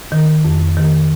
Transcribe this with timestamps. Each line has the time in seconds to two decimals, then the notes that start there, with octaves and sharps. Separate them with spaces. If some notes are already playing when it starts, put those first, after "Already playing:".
0.12 D#3
0.45 F2
0.77 D#3